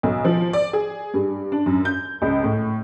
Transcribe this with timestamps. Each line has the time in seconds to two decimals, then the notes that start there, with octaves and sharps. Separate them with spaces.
0.03 B1
0.25 F3
0.53 D5
0.73 G#4
1.14 G2
1.52 D4
1.66 F#2
1.85 G6
2.22 C#2
2.44 A2